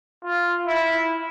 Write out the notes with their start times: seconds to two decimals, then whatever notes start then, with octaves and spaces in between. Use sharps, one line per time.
0.24 F4
0.67 E4